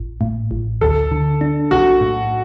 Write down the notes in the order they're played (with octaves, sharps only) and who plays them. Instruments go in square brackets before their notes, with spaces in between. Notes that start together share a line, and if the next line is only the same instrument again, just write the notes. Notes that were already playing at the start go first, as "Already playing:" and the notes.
Already playing: [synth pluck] A1
A2
A1
[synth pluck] D2 [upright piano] A4
[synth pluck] D3
D4
[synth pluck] B1 [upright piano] F#4
[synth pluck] A2